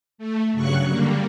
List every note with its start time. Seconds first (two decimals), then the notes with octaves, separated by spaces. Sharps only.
0.18 A3
0.52 G2 C#3 F#3 C#6 F#6
0.87 D3 G3 A#3